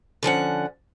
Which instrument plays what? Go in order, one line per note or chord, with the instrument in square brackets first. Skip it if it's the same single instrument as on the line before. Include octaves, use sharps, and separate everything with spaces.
[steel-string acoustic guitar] D3 F3 C#4 F#5